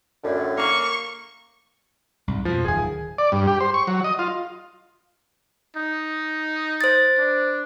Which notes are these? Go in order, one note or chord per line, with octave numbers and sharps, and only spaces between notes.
F#2 A2 D3
A#3 C#6
C2 G#2
F2 B2 F3
D1 D#3 G#4 G#5
D5
G2
G4
C5
C#6
F#3
D#5
F4
D#4
C5 A6
D4